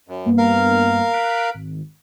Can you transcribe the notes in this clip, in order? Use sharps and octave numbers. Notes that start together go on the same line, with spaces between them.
F#2
G2 A#3 B3
A#4 F5
F#6 B6 D7
G#1